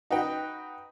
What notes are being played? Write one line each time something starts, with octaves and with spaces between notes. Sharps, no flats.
D#4 F#4 B4 G5